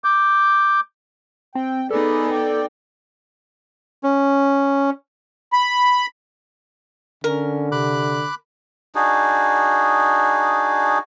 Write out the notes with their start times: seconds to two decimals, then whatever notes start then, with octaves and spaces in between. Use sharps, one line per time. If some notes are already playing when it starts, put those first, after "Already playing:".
0.04 D6 G6
1.55 C4 G5
1.91 B3 D#4 G#4 A4 B4 D5
2.30 D5 G5
4.03 C#4
5.53 B5
7.24 D3 C#4 A#4
7.72 C3 B5 D6 F#6
8.95 D4 D#4 F#4 G#4